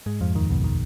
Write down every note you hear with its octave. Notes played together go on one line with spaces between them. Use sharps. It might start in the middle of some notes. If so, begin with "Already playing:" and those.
G#2 G#3
F2 F3
D#2 D#3
B1 B2
D#3